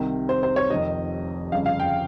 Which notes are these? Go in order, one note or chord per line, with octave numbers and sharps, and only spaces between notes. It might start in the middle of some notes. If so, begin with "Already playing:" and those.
Already playing: C2 C3 D#3
C5
C5
C#5
F1 F2 D#3 D#5
G1 F2 C#3 F5
F5
G5